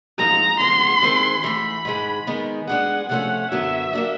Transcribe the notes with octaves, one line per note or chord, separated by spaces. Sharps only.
G#2 F3 G#3 C4 D#4 A#5
C#3 F3 G#3 B3 C6
G#2 D#3 G#3 C4
G#2 E3 A3 B5
G#2 D#3 G#3
D#3 G#3 B3 D#4
G#3 B3 D4 F4 G#4 F#5
C3 F3 A3 C#4 F#5
F#2 D3 F#3 B3 E5
F#3 A#3 D4